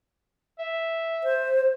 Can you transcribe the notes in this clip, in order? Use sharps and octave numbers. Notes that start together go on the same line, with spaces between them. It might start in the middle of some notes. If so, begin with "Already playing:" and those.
E5
C5